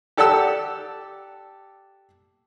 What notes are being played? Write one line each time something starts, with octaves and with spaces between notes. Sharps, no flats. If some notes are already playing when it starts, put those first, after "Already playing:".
G4 A4 D5 F#5 A5 E6